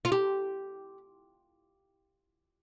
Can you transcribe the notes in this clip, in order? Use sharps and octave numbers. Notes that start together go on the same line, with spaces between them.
F4
G4